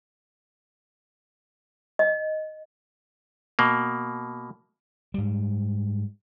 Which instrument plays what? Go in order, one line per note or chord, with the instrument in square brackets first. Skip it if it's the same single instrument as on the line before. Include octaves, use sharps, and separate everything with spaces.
[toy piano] D#5
[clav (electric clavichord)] B2 A#3
[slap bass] G#2 G3